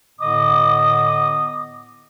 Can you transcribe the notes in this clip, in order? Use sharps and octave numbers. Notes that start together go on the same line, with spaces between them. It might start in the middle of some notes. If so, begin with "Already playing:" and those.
A2 D3 B3 D#5 D6 D#6